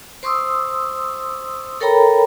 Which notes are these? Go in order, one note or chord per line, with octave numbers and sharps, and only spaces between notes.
C5 C6 C#6 D#6 E6
A4 A#4 C#5 G5 A#5 B5